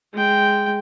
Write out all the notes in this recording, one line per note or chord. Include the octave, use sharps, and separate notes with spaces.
G#3 G5